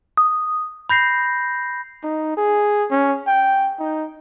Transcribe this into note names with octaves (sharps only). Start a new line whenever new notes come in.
D#6
B5 G6 A#6 C7
D#4
G#4
C#4
G5
D#4